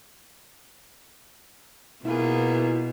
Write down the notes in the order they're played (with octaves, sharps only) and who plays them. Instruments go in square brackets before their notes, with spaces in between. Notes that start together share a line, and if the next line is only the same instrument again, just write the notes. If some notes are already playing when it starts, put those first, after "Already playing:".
[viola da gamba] B2 [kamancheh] A#3 G#4 [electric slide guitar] E4 F4 B4